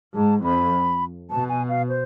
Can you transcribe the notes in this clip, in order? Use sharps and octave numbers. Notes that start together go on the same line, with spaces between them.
G#2 A5
F2 B5
B2 A5
G#5
F5
C5